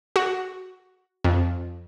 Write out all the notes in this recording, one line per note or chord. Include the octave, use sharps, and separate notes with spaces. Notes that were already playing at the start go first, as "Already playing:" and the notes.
F#4
F2